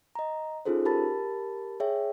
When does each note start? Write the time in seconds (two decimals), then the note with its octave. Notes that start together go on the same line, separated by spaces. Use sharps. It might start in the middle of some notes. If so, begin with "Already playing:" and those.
0.15 D#5 A#5
0.65 C#4 D#4 F4 G#4 A4 C5
0.85 G4 A#4 A5 B5 A6
1.80 G#4 C#5 E5 G5